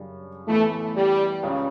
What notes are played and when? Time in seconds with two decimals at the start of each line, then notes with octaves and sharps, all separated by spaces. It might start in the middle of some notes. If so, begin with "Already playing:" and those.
Already playing: F#2 C#3 G3 D4
0.47 A2 E3 A3 B3
0.96 G3
1.43 C#2 C#3 G3 C#4